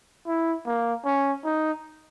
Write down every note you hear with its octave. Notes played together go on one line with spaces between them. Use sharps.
E4
A#3
C#4
D#4